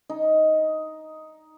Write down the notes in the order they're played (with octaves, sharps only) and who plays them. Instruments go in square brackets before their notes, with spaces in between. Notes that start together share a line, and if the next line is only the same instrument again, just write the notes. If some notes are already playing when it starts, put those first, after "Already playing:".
[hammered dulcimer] D#4